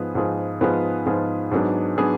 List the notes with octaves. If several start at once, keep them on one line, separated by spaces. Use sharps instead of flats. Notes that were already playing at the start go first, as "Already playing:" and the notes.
Already playing: G#2 F3 B3 F4 G#4
G#2 F3 B3 F4 G#4
G#2 F3 B3 F4 G#4
G#2 F3 B3 F4 G#4
G#2 F#3 B3 D4 G#4
F#3 B3 D4 G#4